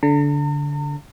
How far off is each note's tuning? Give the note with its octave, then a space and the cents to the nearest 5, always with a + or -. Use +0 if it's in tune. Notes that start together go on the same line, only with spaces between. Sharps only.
D3 -20 A#5 -45